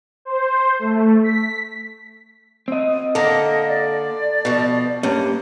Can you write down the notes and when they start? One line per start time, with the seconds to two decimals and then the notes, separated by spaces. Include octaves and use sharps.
0.25 C5
0.79 A3
1.24 B6
2.68 C4 D#5
3.15 D3 A#3 A4 D#5
3.68 D5
4.45 B2 F3
5.03 G2 A#3 C#4